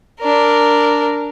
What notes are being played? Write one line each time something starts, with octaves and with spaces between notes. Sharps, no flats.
D4 A#4